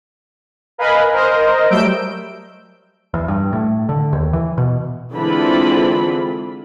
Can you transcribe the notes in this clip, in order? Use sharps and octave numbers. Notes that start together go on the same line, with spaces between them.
A#4 B4 D#5 F5 G#5 B5
A#4 C5 D#5
F#3 G3 A3 E6 G6 D7
E2
G2
A2
D3
D#2
E3
B2
D3 E3 G#3 C4 F4 B5